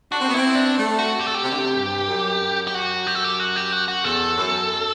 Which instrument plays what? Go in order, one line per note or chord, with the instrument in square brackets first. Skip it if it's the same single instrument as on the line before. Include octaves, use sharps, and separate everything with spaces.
[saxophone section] D4 [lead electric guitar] F#4
[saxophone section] C4
B3
[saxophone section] C4 [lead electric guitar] E4
[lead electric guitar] D4
[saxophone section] A3
[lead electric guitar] F#4
G4
A4
G4
[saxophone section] C3
D3
C3
G2
F#2
F#2
[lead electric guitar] G4
F#4
G4
A4
G4
F#4
G4
F#4
F#4
[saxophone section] E2 [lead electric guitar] A4
[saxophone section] F#2